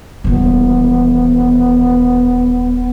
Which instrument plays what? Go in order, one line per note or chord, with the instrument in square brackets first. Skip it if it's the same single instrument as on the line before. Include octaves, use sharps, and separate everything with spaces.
[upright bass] D#1 E3 [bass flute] B3